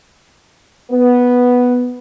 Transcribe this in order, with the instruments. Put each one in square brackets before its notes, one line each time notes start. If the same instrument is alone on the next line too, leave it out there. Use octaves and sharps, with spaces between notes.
[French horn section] B3